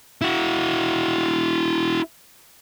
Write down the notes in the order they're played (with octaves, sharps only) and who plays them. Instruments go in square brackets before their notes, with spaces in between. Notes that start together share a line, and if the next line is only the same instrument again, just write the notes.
[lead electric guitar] E4 F#4